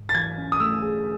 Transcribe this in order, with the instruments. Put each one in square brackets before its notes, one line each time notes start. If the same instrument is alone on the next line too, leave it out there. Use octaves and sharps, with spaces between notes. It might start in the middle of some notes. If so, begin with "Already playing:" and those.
Already playing: [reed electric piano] G#2
[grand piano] A6
[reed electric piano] E3 [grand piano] G#6
[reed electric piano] C#4
[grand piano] D#6
[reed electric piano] A3 [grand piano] E6
[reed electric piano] G#4